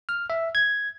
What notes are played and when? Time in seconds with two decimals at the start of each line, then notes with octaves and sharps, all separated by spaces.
0.09 F6
0.30 E5
0.55 G#6